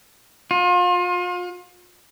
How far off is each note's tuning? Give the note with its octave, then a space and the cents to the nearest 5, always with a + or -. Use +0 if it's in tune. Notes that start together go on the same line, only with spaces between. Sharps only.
F4 +35